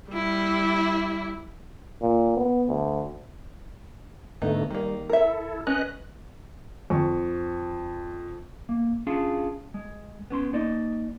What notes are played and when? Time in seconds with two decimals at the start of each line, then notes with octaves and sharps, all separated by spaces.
0.11 G3 E4
2.01 A#2
2.37 B3
2.68 D2
4.42 G#2 D3 A3 B3 D#4
4.71 D#3 G3 A#3
5.10 E4 A4 A#4 E5
5.67 C#4 B4 D#5 F#6
6.90 F2 C#6
8.69 A#3
9.07 C#4 D4 F4 G#4 F5
9.74 G#3
10.30 B3 C#4 C6
10.53 A#3 D#4 D5 D#5